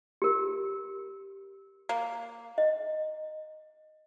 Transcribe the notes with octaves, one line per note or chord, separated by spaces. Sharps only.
G4 A#4
A#3
D#5